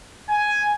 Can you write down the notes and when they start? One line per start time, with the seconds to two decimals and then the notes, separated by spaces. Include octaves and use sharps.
0.29 G#5